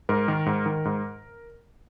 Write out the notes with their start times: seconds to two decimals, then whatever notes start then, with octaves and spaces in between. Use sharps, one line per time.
0.09 G#2 A#4
0.28 D#3
0.46 G#2
0.66 D#3
0.85 G#2